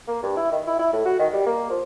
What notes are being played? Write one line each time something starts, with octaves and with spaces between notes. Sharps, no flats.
A#3
G2
E4
D#3
E4
E4
A2
F#4
D#3
G3
A#3
F3